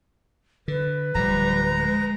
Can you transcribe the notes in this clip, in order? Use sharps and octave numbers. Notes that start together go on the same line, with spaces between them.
D3 B4
D1 F3 G3 A#5
G#3